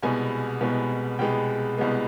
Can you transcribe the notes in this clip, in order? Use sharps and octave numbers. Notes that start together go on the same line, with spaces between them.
C2 B2 G#3 B3 G#5
C2 B2 G#3 B3
C2 B2 G#3 B3 G5
C2 B2 G#3 B3